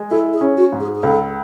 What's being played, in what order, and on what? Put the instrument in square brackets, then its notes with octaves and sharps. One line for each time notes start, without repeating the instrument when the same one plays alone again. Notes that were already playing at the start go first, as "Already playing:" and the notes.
Already playing: [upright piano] G#3
[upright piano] E4 [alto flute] A4
[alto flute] G#4
[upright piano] C#4
[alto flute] F#4
[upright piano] G#2
[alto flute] G#4
G#4
[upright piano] C#2 [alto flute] A4